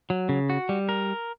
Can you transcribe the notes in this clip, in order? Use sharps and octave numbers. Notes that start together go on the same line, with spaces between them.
F#3
C#3
F#4
G3
A#4